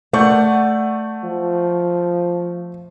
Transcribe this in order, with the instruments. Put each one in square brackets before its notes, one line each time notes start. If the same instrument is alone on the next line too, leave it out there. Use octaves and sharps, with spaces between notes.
[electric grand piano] A3 C#6 G6 [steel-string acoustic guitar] D5 F#5
[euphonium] F3